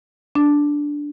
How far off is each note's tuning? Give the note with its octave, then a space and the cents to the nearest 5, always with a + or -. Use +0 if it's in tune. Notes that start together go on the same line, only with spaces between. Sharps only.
D4 -5